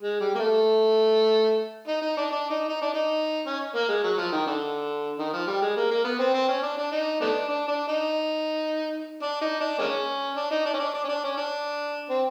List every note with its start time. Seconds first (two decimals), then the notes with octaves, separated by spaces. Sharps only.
0.01 G#3
0.20 G3
0.35 A#3
0.40 A3
1.88 D#4
2.02 D#4
2.17 D4
2.31 D4
2.50 D#4
2.69 D#4
2.82 D4
2.94 D#4
3.47 C#4
3.75 A#3
3.89 G#3
4.04 F#3
4.18 F3
4.32 D#3
4.47 D3
5.19 D#3
5.34 F3
5.47 G3
5.62 G#3
5.77 A#3
5.91 A#3
6.05 B3
6.19 C4
6.34 C4
6.48 C#4
6.63 D4
6.77 D4
6.92 D#4
7.21 A3 B3 D4
7.49 D4
7.68 D4
7.88 D#4
9.22 D4
9.42 D#4
9.60 D4
9.79 G#3 A#3 C#4
10.36 D4
10.51 D#4
10.66 D4
10.74 C#4
10.79 D4
10.94 D4
11.04 C#4
11.09 D4
11.24 C#4
11.37 D4
12.10 C4